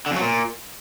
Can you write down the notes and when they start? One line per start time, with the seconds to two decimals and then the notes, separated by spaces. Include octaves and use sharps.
0.06 D3
0.11 F2
0.16 F#3
0.21 A#2